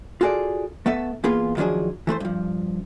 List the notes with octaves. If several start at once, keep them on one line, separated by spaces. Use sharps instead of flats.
F4 F#4 G#4 A4 D5
A3 B3 A4 E5
E2 A#3 B3 F4 G#4 B4
D#3 F3 F#3 D4 G#4
E3 A3 B4 C5
G2 F3